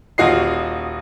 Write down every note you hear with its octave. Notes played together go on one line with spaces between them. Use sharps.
D#1 F4 F#4 D#5 C7